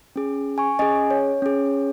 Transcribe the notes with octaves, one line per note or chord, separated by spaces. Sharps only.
C#4 G#4
G#5 C#6
C#4 G#4 D#5 G#5
C#5
C#4 G#4